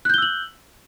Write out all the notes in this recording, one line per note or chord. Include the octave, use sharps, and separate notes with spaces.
E6 F#6 G6 F#7 G7